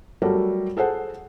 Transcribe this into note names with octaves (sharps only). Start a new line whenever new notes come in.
F#3 G3 A3 F#4 A4 A#4
G#4 A4 C5 F#5